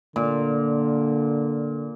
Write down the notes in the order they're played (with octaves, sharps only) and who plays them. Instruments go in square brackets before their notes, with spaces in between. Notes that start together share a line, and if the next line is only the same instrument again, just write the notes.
[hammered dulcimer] A#2 [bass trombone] D3